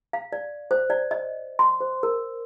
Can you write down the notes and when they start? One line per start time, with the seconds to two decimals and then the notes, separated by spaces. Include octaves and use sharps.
0.13 F5
0.33 D5
0.71 C5
0.90 D5
1.11 D#5
1.59 C6
1.81 C5
2.03 A#4